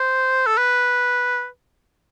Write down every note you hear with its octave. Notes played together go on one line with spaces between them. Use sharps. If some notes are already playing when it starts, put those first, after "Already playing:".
Already playing: C5
A4
B4